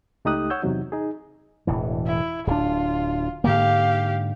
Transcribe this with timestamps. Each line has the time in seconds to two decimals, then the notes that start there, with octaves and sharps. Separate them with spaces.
0.25 C#2 A3 D#4 G4 D#6 F#6
0.50 C#5 F#5 E6 G6
0.62 E2 C3 F#3 D#4
0.92 D#4 G#4
1.67 E1 A2 E3
2.06 E4
2.47 D1 D4 F4
3.44 G#2 D3 A#3 G4 F5